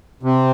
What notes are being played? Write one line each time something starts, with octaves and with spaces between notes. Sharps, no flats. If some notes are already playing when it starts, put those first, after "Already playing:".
C3